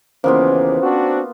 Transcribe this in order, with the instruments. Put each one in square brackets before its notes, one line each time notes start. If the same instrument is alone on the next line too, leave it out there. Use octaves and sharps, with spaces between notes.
[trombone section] D#2 C#3 E3 [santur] A#3 B3 F4 [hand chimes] C#4 C5
[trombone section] C4 D4 F#4